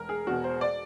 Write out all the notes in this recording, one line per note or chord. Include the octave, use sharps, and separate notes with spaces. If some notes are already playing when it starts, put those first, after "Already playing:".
Already playing: E1 A#4
G#4
E2 B2 F#4
C5
D5